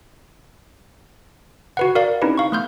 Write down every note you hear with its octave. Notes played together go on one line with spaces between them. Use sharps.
F#4 B4 F#5
F#4 A#4 D5 F5
C4 C#4 D#4 E4 G4 B4
F5 C#6
A3 B3 C6 F6 G6